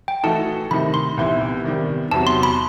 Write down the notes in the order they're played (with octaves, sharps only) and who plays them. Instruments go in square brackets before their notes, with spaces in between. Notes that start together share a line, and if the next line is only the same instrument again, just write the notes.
[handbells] G5
[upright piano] E3 A3 D#4 F#4 A4 [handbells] A5
[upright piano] C3 D#3 A3 D#4 [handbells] B5
[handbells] C6
[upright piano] C2 C3 E3 B3 E4
C3 D#3 G3 B3
[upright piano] E2 C3 F#3 B3 F#4 [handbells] A5
[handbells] C6
B5